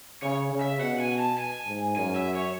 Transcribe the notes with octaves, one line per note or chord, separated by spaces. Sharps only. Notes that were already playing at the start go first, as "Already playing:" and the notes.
C#3 C#5
C#3
E5
B2 F#5
G#5
A5
G#5
G#2
F#2 G#5
E5
C#5